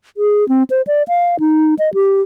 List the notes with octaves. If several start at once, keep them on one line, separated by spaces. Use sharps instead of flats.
G#4
C4
C5
D5
F5
D#4
D#5
G4